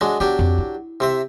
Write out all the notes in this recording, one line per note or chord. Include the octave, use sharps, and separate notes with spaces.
F#3 G#3 D4
F#3 B3 D4 G4
F2
E4
C3 C4 E5